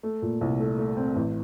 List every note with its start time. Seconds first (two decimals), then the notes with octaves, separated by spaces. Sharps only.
0.03 A3
0.22 A#2
0.41 C2
0.60 A3
0.79 A3
0.97 C4
1.16 A1